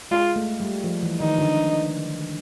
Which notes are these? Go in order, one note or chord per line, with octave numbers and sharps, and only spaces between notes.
G#3 F4
A3
G3
F3
E3
D#3 D#4
D3